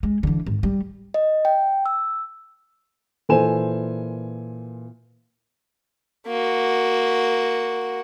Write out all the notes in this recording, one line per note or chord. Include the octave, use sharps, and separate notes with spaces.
G#3
D3 E3
G#1
G3
D#5
G5
E6
A#2 E3 A4 C5 G#5 E7
A#3 F#4